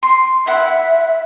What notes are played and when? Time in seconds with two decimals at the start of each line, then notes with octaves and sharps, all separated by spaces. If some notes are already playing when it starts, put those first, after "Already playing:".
0.03 C6
0.47 E5 F#5 B5